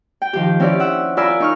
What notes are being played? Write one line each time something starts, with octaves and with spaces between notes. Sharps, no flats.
G5
D#3 F3 G4
C4 C#4 E4 G4 D5
E5 F#5 E6
F4 A#4 D5 G#5 B5 E6
D#4 C#6 F6